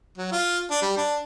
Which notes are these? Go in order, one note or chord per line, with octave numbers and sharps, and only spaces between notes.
F#3
F4
D4
G3
D4